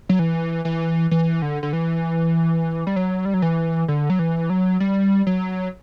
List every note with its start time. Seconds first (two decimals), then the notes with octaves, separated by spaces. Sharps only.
0.09 F#3
0.19 E3
0.65 E3
1.11 E3
1.42 D3
1.63 D3
1.73 E3
2.87 G3
2.96 F#3
3.25 G3
3.34 F#3
3.42 E3
3.88 D3
4.10 F#3
4.19 E3
4.50 F#3
4.80 G3
5.27 F#3